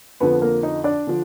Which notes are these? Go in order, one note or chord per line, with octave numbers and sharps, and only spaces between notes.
F2 D3 F3 B3 B4
A#3 A#4
D#4 D#5
D4 D5
D3 F3